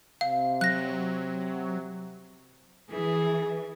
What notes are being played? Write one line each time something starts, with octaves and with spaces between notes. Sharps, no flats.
C3 F5
F#3 F#6 A#6
E3 G#4